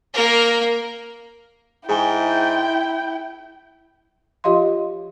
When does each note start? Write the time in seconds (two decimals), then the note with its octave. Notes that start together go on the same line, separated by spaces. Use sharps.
0.14 A#3 A#4
1.89 G#2 E4 G#4 G5 G#5 G7
4.44 F3 F4 G4 D#5 F5 C6